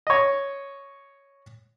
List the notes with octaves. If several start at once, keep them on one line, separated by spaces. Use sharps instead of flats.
C#5 D#5